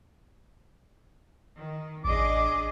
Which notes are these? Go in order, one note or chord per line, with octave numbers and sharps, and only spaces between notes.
D#3
A1 D4 G#4 D#5 D6